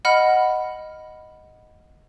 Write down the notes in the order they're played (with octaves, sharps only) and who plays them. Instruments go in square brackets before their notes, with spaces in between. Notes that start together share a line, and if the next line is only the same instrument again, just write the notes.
[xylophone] D#5 F#5 B5 F6